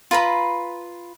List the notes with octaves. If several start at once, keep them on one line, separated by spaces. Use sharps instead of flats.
F4 B4 A#5 B5